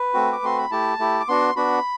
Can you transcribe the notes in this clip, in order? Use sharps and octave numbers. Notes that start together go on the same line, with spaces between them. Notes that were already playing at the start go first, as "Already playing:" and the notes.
Already playing: B4
A3 C4 F#4
D6
A3 C4 F#4 C6
B5
A3 E4 G4 A5
A3 E4 G4
D6
B3 D4 F#4 C6
B3 D4 F#4 B5